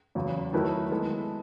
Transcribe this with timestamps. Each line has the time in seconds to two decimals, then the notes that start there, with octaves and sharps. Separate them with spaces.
0.15 E2 C#3 F#3
0.53 D#3 F#3 A3 E4 B4
0.91 G#3 B3 E4 A4